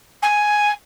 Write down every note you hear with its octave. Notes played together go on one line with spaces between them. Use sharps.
G#5